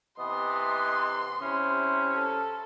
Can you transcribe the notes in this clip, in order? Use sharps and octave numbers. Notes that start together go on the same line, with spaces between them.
C3 E3 B3 D#5 C6
C3 C#4 E4 C5
A4